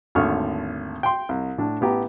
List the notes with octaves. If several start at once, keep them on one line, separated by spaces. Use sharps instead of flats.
G#1 D#2 D3 A3 C#6 F6
G5 C6
C2
A2 D4
A1 B3 G4 G5 A#5